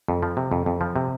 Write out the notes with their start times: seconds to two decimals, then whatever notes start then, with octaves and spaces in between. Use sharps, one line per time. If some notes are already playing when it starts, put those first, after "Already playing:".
0.08 F2
0.23 F3
0.37 C3
0.52 F2
0.66 F2
0.81 F3
0.96 C3